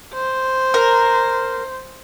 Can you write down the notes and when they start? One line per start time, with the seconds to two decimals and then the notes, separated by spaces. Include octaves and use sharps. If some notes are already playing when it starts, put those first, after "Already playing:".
0.14 C5
0.74 A#4